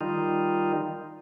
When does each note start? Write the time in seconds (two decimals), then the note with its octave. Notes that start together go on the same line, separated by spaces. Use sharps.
0.01 D#3 G3 D#4 F4